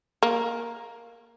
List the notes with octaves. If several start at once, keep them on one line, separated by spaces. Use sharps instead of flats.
A#3